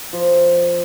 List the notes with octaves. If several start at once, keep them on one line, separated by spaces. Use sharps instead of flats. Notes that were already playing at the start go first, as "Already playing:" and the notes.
F3